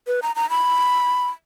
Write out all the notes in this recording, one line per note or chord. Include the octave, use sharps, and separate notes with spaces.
B4
A#5
A#5
B5